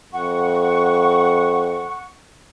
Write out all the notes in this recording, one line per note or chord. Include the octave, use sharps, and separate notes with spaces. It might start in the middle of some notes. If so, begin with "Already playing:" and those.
F2 F#5 C#6